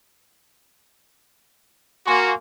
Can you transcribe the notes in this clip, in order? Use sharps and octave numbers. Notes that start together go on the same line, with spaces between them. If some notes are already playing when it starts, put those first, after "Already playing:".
A#3 F#4 G#5 C6 C#6